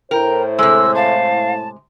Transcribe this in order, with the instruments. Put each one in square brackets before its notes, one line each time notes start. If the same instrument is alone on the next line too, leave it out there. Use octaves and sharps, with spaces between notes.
[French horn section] A2 E4 C5 [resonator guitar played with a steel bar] A#4 [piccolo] G5
[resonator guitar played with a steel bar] C3 G#3 [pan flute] A4 [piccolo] E6
[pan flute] F5 [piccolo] A5